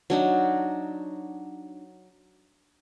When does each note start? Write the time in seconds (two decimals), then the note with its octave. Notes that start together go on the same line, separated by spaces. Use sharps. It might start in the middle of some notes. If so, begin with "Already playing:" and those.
0.10 F#3 D4 D#4